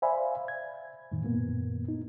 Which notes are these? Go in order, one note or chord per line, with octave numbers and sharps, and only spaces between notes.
C5 D5 E5 F5 G#5 B5
G#6
F2 A2 D#3
F#2 A#2 A#3 B3
D#4